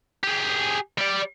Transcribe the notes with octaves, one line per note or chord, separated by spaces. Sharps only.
G4 G#4
G3 D5